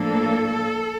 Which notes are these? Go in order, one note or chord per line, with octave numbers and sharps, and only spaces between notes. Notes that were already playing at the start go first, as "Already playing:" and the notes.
Already playing: A2 F3 A#3 D4 A4